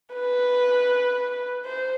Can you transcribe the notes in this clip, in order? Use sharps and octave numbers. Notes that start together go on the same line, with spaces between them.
B4
C5